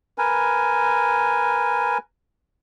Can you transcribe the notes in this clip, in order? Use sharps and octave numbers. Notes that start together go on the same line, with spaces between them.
A#4 B4 G#5